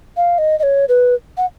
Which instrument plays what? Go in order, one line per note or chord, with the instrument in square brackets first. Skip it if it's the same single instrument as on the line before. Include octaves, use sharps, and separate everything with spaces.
[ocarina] F5
D#5
D#5
C#5
B4
F#5